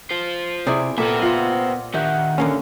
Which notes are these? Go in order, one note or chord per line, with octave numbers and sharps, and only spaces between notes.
F4 C5
C3 E4 G#4 D5
A#2 B3 C4 A4 A#4 C5 E5
F4 F#5
D#3 D4 G4 E5 F#5
D3 A#3 C#4